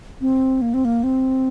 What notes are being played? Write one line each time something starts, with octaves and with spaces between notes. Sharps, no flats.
C4
A#3
C4
A#3
C4